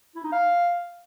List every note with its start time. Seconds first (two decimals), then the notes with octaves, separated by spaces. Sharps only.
0.16 E4
0.24 D#4
0.32 F5